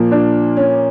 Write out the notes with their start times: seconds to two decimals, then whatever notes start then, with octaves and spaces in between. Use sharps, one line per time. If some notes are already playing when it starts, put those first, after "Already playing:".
Already playing: A#2 F3 A#3
0.12 D4
0.57 C#4